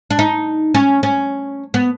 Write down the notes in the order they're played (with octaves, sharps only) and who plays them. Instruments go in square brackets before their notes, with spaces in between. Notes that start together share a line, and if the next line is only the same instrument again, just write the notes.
[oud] D4
D#4
C#4
C#4
B3